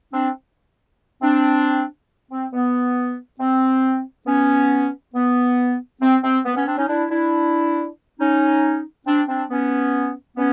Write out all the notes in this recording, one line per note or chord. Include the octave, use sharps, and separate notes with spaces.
C4 D4
C4 D4
C4
B3
C4
B3 C#4
B3
C4
C4
B3
B3 C#4
C4 D4
C#4 D#4
D4 E4
D4 E4
C#4 D#4
C4 D4
C4 D4
B3 C#4
B3 C#4